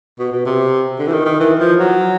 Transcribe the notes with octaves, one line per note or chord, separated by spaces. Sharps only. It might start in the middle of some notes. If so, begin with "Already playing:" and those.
B2
B2
C3
D3
E3
D#3
D#3
E3
F3
F#3